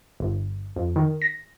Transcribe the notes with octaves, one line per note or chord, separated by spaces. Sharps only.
G1
F2
D#3
A#6